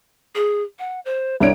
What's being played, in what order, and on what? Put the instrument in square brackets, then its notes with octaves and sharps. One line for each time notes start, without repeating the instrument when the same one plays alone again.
[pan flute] G#4
F#5
C5
[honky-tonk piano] C2 D4 D7 [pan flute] C#5